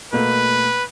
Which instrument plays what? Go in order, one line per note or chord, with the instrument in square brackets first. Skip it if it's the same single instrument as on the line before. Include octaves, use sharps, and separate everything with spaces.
[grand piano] B2 A3 A#3 [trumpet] B4